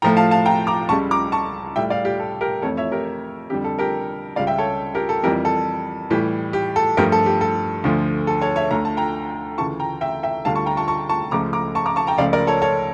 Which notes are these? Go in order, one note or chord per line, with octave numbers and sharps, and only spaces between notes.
A2 F3 A3 G5 A#5
F5 A5
F5 A5
G5 A#5
A#5 D6
C#2 C#3 G3 A5 C#6
A#5 D6
A5 C#6
A2 G3 E5 G5
D5 F5
G4
A4
G4 A#4
F2 E3 A3 A4 C#5
C#5 E5
G4 A#4
F2 D3 G3 G4
A4
G4 A#4
C#2 C#3 G3 D5 F5
E5 G5
A4 C#5
G4 A#4
A4
F2 E3 G3 G4 A#4
A4
A2 E3 G3 G4
G4
A4
G2 F3 A3 G4 A#4
A4
G4
A4
D2 D3 F3 A3
A4
A4 C#5
C#5 E5
D2 D3 A3 A#5
A5
G5 A#5
D2 C#3 E3 A5 C#6
G5 A#5
E5 G5
E5 G5
D2 D3 G3 F5 A5
A5 C#6
G5 A#5
A5 C#6
A5 C#6
A5 C#6
C#2 C#3 F3 A3 A#5 D6
A#5 D6
A5 C#6
A#5 D6
A5 C#6
G5 A#5
C#2 C#3 F3 A3 D5 F5
A#4 D5
A4 C#5
A4 C#5